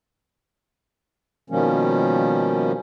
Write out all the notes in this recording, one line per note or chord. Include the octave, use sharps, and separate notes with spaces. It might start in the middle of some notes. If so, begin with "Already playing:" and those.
B2 D#3 F3 G3 A#3 C#4